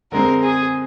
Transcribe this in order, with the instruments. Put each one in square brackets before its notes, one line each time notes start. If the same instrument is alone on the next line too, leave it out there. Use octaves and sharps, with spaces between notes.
[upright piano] D3 G#3 C4 [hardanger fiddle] A#4
[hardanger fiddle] G#4